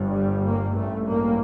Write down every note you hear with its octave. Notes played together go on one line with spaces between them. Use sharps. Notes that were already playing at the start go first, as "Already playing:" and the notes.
Already playing: G1 G2
G3
A#3
A1 G2 A3
A#3